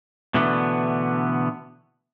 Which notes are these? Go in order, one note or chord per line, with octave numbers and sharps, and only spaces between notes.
B2 D3 E3 A3 B3 D4